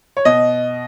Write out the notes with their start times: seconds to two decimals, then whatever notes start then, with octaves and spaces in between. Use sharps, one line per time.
0.17 C#5
0.25 B2 D#5